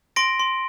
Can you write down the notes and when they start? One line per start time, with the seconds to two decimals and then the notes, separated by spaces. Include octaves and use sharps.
0.16 C6 A#6 D7
0.40 C6